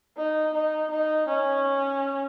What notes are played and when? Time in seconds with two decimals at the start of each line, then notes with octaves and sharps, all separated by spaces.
0.17 D#4
0.54 D#4
0.91 D#4
1.28 C#4